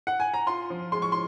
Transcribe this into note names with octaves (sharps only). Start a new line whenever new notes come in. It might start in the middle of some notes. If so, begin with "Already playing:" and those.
F#5
G#5
A#5
F4 C6
F3
G#3 C6
C#6
C6